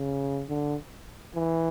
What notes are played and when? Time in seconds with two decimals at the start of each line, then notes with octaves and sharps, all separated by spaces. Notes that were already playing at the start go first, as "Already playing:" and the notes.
Already playing: C#3
0.49 D3
1.35 E3